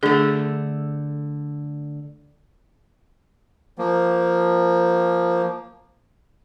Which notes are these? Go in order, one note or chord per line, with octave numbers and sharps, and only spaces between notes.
D3 A3 D4 G#4
F3 A#3